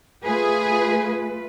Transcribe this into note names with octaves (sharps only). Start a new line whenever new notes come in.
A3 F4 G#4 B4